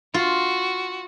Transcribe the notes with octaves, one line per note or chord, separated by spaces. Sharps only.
F4 F#4